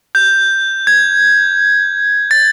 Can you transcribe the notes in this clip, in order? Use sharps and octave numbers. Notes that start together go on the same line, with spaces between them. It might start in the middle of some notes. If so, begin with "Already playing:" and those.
G6
G#6
A6